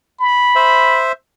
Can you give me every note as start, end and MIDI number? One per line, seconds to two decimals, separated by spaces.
0.20 1.05 83
0.56 1.12 72
0.56 1.12 76